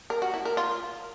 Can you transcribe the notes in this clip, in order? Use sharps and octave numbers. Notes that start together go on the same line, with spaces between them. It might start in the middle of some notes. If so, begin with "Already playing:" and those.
A#4
F#4
E4
A#4
F4